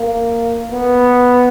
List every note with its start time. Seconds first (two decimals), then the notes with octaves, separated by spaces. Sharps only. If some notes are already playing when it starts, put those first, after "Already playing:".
Already playing: A#3
0.71 B3